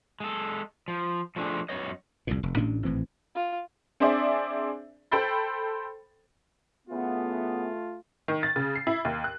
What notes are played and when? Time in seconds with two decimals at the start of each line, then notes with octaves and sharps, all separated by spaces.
0.20 G#3 A4
0.88 F3
1.36 F3 A3 D4 G#4
1.69 F#2 G#3 C#5 D#5
2.27 C2 F2 A#2
2.43 F1
2.57 A1 A2 C#4 D4
2.84 G#1 A2 E3 C4
3.35 F4
4.00 C4 D4 G#4 C5 D5 E5
5.12 A4 C5 G5 B5 C6 A6
6.88 C#3 E3 A3 B3 F4
8.28 D#3
8.43 A6
8.56 C#3
8.75 C7
8.87 E4
9.05 D#2
9.24 F#6